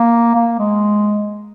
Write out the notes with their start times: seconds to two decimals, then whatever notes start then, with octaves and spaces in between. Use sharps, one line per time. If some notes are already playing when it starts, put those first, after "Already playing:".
Already playing: A#3
0.35 A#3
0.59 G#3